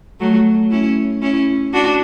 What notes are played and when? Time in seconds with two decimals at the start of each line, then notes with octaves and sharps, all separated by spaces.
0.20 F#3 A3
0.71 C#4 E4
1.22 C#4 E4
1.73 D4 F#4